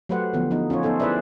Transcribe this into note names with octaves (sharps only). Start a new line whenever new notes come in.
F#3 A3 G4 B4 C5 F#5
D3 F3 B3
F3 B3 D#4
C#4 F4 C5 C#5
B3 D#4 A4 C5
E4 G#4 B4 C5 D5 E5